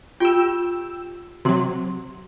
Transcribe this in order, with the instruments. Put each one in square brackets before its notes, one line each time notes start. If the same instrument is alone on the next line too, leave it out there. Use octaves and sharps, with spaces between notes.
[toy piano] F4 G4 [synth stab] G5 E6
[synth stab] C3 F#3 [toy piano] F#4 C6